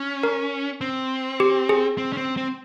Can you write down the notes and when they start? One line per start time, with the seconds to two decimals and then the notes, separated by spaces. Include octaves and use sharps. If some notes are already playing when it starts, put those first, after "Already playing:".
Already playing: C#4
0.23 A#4
0.81 C4
1.40 G4
1.69 G#4
1.98 C4
2.13 C#4
2.17 C4
2.37 C4